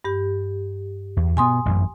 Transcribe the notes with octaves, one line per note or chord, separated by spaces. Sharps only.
G2 G4
E2
B2 B3 G#5 C6 D#6
A1 F#2